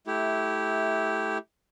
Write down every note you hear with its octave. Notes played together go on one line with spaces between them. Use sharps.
A3 E4 G4